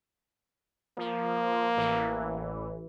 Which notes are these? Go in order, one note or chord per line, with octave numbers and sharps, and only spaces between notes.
F3 A#3
A1 E3